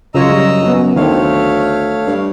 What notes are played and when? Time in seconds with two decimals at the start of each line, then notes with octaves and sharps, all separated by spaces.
0.15 F#2 C#3 F4 C#5 D#5 A#5 E6
0.30 F#3 G3
0.63 B3 C#4 F#4
0.96 D2 D#3 A3 C4 C#5 F5
2.07 G2